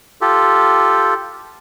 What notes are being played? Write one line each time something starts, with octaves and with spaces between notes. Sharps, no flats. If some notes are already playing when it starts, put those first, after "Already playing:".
F4 G4 A4